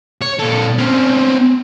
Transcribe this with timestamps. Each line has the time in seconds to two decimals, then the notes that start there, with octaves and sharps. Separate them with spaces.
0.22 C#5
0.40 A#2 A4
0.78 C4 C#4